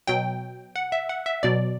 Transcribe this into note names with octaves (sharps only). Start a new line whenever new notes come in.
B2 F#3 G5
F#5
E5
F#5
E5
B2 F#3 D5